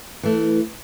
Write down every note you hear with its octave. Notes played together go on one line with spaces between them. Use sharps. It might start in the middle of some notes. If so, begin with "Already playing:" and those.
E3 A3